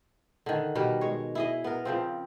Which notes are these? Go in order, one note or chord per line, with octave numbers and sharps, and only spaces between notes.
D3 D#3
B2 G3 D#4 A#4
G#3 C#5
E4 G#4 D#5
B3 A#4
C#3 F3 C4